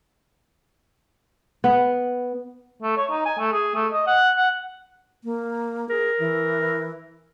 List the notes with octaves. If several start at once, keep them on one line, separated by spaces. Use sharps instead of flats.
B3
A3
C#5
D#4
G#5
A3
G#4
A3
D#5
F#5
F#5
A#3
G#4 A#4
E3